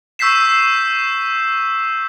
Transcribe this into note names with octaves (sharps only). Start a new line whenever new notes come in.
C#6 E6 G6 B6 C7 E7